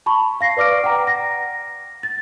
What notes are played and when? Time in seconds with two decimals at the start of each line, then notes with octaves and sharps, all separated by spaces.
0.06 A5 B5 C#6
0.41 F5 A#6 C7
0.57 B4 D5 D6 F6 D7
0.84 F#5 G5 A#5
1.07 A#6
2.03 A6